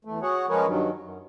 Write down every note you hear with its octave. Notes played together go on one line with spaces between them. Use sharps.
E2 A3
F#4 G#4 C#5 F#5
F3 G#3 C#4 A#4 B4 C#5
G2 D#3 F#3
F#2